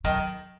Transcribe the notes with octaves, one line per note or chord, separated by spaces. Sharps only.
D#3 F#3